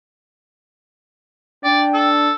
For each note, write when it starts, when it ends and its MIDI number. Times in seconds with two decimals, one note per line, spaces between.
1.64 2.32 62
1.64 1.82 74
1.64 2.09 79
1.94 2.34 69